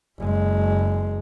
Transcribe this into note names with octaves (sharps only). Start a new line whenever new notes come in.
F#1 G#3